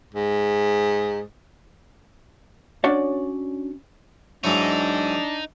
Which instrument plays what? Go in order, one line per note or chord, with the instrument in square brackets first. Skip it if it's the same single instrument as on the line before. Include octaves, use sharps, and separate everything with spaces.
[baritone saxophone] G#2
[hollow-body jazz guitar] C#4 D4 F#4 C#5 D5
[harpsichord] G#2 E3 F#3 [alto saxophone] D4 [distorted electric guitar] D#4